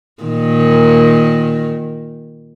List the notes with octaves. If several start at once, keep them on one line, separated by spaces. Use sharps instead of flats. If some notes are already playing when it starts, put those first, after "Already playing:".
A#2 D#3